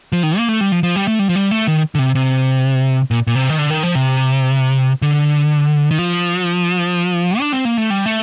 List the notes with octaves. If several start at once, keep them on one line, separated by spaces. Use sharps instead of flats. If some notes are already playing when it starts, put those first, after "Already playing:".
F3
D#3
A#3
A3
G3
F3
F3
G3
A3
G3
F3
G3
A3
D#3
D3
C3
C3
A#2
A#2
C3
D#3
D3
D#3
F3
C3
D3
D#3
F3
D4
C4
A#3
A3
G3
A3